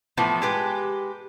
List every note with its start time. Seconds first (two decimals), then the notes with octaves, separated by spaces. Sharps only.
0.17 A2 E3 F3 B3
0.42 G#3 G4 B4